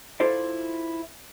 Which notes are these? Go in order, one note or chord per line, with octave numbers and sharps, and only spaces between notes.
E4 F4 A4 C5 D5